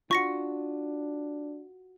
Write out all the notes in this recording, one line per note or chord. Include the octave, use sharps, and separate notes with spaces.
D4 F4 F#4 C#6 A#6 C#7